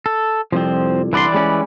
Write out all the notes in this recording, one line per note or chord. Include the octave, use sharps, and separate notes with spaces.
A4
C2 F2 F3 C4
C2 D3 E3 B4 D5 C6
G3 G#3 C#4